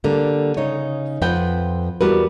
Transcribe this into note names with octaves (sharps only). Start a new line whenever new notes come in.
D3 G3 A#3
C#3 D#4 C#5
F2 C4 B4 F#5 G5
E2 G3 F#4 A#4 B4